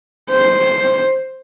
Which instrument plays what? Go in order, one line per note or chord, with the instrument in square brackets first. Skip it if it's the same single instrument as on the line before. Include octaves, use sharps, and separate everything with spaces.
[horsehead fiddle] C5